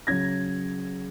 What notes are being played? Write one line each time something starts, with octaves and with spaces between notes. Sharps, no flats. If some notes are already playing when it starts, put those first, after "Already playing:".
C#3 F#3 G#6 A#6